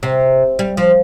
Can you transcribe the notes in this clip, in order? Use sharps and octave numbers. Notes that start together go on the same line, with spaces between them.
C3
G3
F3